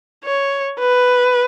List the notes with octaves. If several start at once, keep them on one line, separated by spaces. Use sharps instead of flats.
C#5
B4